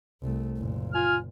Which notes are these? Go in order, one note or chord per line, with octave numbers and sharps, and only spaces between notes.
C2 A3
F#1 A#2
F4 G#5 F6